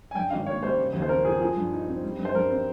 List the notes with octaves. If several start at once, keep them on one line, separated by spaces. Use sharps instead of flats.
G#5
G2 G5
G#1 F5
A#3 C#5
G3 C5
C#3
D#2
C5
C4 A#4
F3 G#4
F3 G#4
G2
D#4
C4
G3
G2
C5
G2 A#4
C4